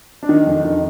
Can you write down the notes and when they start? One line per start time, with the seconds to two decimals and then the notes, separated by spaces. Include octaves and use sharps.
0.23 D4
0.29 D#3 D#4
0.47 F2
0.65 D#3